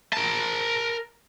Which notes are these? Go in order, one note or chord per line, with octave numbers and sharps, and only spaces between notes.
A#4 A5